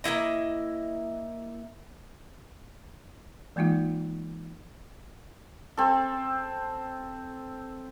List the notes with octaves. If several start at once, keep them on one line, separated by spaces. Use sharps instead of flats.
A#3 C4 E4 D#5
E3 G#3 A#3 D#4 F4
C4 A4